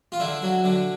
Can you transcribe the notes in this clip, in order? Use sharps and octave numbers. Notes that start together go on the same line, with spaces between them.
F4
D3 E4
F#3
D3